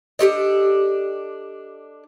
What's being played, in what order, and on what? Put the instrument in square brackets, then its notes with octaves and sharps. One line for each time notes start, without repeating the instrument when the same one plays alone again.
[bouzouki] D4 G4 A4 D#5